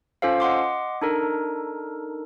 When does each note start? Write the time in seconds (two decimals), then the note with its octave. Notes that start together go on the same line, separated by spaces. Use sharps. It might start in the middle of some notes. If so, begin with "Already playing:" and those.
0.22 C#4 F4 A4 C5 F5
0.40 D#5 F#5 C6 D6
1.02 D4 D#4 A4 A#4